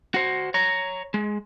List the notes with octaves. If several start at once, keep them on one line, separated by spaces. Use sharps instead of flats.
F#4 C5
C#5 A#5
G#3